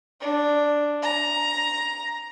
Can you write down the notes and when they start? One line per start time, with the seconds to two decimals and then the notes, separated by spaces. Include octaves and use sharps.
0.21 D4
1.02 A#5